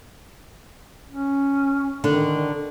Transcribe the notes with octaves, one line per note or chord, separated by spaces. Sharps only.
C#4
D3 D#3 D4